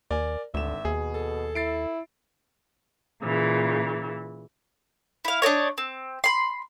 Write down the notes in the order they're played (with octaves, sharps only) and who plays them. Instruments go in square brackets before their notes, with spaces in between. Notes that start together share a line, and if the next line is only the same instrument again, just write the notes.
[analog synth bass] D#2 [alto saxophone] A#4 [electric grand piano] D5 G#5
[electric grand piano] G#1 E7 [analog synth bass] D2 [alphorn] D3 [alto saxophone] E5
[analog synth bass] D#2 [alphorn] B2 [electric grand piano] G#4
[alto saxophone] A4
[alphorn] E4 [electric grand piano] A6 C7 D7
[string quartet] A#2 C#3 E3
[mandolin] E4 F5
D4 D#4 A#4 C#5
C4
B5 C6